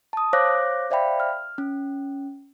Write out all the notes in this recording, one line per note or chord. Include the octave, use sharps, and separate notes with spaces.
A5 D#6
C5 C#5 F5 D6 F#6 A#6
C5 D5 E5 F5 G5 B5
F6
C#4